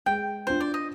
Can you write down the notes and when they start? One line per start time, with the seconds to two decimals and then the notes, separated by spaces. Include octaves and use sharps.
0.06 G#3 G5
0.47 D4 F4 C5
0.60 D5
0.74 D#5